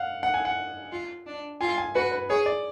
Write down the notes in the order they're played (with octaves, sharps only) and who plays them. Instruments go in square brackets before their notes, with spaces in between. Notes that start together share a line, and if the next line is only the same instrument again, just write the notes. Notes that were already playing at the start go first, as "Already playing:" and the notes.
Already playing: [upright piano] F5 F#5
F#5
G#5
F#5
[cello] F4
D4
[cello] F4 [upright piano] G#5
[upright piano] G#5
[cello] F#4 [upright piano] B4
[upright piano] B4
[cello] G#4 [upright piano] C#5
[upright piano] D5